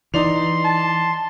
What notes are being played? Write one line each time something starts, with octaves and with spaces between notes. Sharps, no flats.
E3 D#4 D5 C6 F7
A5